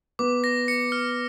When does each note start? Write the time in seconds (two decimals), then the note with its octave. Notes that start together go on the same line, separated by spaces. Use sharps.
0.19 B3 D6
0.44 A#6
0.68 C#7
0.92 F6